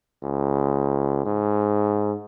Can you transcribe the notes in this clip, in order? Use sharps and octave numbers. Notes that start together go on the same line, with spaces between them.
C#2
G#2